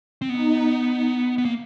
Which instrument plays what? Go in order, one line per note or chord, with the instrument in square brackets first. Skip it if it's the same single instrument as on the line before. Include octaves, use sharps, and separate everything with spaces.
[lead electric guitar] C4
[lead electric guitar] B3 [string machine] D#4
[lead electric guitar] B3
A#3